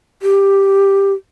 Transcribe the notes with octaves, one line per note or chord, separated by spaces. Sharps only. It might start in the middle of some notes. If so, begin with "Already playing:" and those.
G4